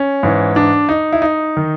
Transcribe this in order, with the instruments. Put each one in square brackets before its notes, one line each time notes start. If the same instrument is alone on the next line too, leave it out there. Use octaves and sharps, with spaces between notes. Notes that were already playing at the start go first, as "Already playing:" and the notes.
Already playing: [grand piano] C#4
G#2 E3
D4
D#4
E4
D#4
D#3